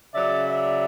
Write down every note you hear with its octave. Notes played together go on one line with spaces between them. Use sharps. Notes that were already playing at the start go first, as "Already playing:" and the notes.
C#3 F#3 D5 E5
D5 E5